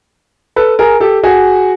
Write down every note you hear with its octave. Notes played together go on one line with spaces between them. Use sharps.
A4 B4
G#4 A#4
G4 A4
F#4 G#4